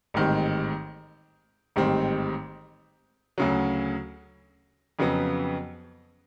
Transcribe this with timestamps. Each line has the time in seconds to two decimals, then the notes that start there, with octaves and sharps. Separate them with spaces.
0.14 A1 G#2 D#3 G3 C4
1.76 A1 G#2 D#3 G3 C4
3.38 D2 C#3 F#3
4.99 F2 C#3 F#3 B3